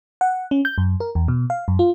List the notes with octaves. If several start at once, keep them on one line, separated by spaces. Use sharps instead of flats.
F#5
C#4
G6
F#2
A#4
E2
B2
F5
F#2
F4